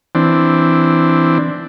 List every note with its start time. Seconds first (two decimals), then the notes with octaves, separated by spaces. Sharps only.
0.15 E3 C4 D4